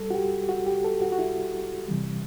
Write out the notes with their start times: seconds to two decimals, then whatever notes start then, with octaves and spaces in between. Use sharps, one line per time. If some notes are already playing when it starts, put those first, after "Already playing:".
Already playing: G3 A4
0.11 F#4
0.15 G4
0.49 F#4
0.67 G4
0.85 A4
1.02 F#4
1.12 F#4
1.19 E4
1.88 C3 E3 G3